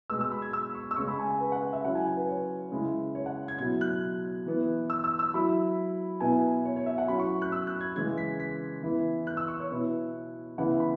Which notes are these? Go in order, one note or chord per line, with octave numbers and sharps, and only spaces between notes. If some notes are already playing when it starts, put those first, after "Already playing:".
B2 G#3 B3 E6
E6
B5
G#6
E6
C#6
E6
C#3 G#3 C#4 C#6
B5
G#5
G#5
B4
F#5
F#5
E5
F#3 C#4 E4 F#5
G#5
G#5
B4
C#5
C#3 G#3 E4
C#5
F#5
G#6
B2 F#3 E4 G#6
F#6
E3 B3 E4
E6
E6
E6
F#3 E4 B5
B2 B3 E4 G#5
C#5
C#5
E5
F#5
F#3 C#4 E4 B5
C#6
F#6
E6
F#6
G#6
C#3 E3 G#3 G#6
B6
B6
E3 B3 E4
F#6
E6
C#6
C#5
B2 B3 E4
C#3 E3 B3 E4 F#5
B5